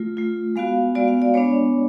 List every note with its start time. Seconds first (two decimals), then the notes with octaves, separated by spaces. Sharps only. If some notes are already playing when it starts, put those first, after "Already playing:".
Already playing: A3 F4
0.17 A3 F4
0.56 G#3 B3 F#4 F5
0.95 G#3 B3 F#4 D5
1.08 F5
1.22 D5
1.34 G#3 B3 D4 C#5